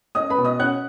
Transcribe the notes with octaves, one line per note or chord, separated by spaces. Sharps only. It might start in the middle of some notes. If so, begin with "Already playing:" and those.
C#4 D#5 D#6
B4 B5
B2
D#5 D#6
C#4 F#5 F#6